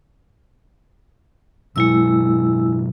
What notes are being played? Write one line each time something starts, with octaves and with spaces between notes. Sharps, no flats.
F#1 B2 F#3 G#3 E4 E6